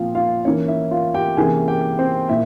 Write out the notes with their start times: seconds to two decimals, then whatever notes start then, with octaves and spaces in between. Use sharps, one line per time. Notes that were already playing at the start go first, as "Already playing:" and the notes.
Already playing: A#2 F3 C4 F4 F5
0.15 F4 F5
0.45 E3 A#3 C#4 C#5
0.68 E4 E5
0.91 F4 F5
1.14 G4 G5
1.37 C3 E3 A#3 C#4 G#4 G#5
1.68 G4 G5
1.99 C4 C5
2.29 A#2 E4 E5